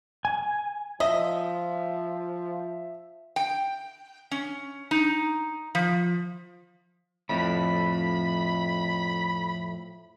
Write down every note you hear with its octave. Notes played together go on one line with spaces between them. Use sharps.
G#5
F3 D#5 E5
G5
C#4
D#4
F3
F2 A2 B5